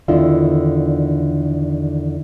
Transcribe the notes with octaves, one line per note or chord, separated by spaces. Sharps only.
E2 D3 D#3 D4 E4 F4